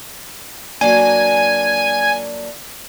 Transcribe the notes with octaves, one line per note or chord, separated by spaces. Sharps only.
F#3 A#3 D4 G#5